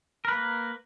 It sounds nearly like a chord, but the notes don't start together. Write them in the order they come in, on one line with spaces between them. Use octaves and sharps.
A#4 B4 A#3